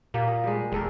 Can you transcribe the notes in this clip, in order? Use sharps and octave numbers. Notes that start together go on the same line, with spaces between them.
A#2 A#3 G4
D#5
G3 G#3
E1 G#3 A4 A#4